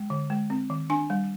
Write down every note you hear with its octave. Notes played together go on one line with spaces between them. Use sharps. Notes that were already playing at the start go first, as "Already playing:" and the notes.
Already playing: G#3
D3
G#3
C4
D#3
D4 G#5
G3